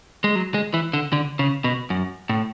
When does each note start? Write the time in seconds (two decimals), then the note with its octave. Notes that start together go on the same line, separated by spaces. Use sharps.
0.24 G#3
0.35 F#3
0.54 G#3
0.74 E3
0.93 D3
1.13 D3
1.39 C#3
1.64 B2
1.90 F#2
2.29 A2